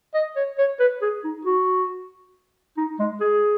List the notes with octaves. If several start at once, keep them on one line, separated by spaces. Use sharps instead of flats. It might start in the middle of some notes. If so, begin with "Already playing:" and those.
D#5
C#5
C#5
B4
G#4
D#4
F#4
D#4
G#3
G#4